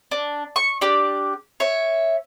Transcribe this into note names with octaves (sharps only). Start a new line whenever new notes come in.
D4
C#6
D4 G4 D5
C#5 E5